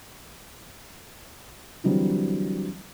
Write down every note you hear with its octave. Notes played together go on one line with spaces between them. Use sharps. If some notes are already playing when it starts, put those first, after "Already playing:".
D3 E3 F#3 G3 C4